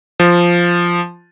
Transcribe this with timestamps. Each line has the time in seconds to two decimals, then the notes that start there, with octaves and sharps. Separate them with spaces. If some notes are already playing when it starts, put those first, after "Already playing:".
0.20 F3